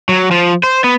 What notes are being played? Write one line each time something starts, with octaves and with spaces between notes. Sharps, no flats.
F#3
F3
C5
B3